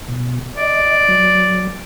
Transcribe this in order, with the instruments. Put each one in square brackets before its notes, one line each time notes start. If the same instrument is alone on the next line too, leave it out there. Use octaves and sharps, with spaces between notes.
[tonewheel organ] B2
[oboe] D5 [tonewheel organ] D#5
[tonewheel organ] F#3